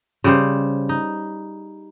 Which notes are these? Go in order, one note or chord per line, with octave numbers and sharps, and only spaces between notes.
C#3 G3 C5
D#4